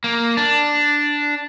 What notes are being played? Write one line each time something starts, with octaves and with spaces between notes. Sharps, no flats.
A#3
D4